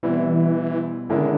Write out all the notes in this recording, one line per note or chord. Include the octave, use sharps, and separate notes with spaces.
B2 E3 G3 C4 E4
D3 D#3 G#3 C#4 E4